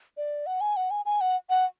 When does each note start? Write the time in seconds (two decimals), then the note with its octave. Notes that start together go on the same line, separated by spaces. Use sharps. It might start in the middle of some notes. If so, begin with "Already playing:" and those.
0.17 D5
0.46 F#5
0.61 G#5
0.76 F#5
0.91 G#5
1.06 G#5
1.21 F#5
1.50 F#5